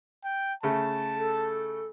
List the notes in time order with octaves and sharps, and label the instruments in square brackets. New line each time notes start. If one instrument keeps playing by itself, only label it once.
[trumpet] G5
[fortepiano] C#3 A3 [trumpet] A5
[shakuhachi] A4